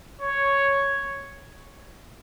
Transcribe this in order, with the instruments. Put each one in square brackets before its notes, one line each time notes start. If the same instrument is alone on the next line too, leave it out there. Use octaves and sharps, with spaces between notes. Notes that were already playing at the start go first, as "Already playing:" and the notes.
[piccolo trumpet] C#5